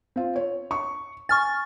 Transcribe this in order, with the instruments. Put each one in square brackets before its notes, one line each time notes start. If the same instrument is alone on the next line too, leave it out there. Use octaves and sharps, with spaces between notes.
[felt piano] C4 F4
C#5
C#6
[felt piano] G#5 [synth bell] C#6 F6 A6